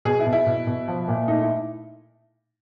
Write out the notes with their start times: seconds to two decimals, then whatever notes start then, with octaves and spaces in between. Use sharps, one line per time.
0.05 B2 G#4
0.20 E4
0.27 B2
0.33 E4
0.47 B2
0.67 B2
0.88 F3
1.08 A#2
1.28 A3 D#4
1.42 E4